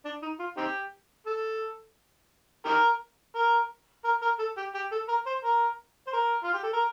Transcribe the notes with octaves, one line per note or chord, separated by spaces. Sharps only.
D4
D#4
F4
C4 D#4 G4
A4
D#4 G4 A#4
A#4
A#4
A#4
A4
G4
G4
A4
A#4
C5
A#4
C5
A#4
F4
G4
A4
A#4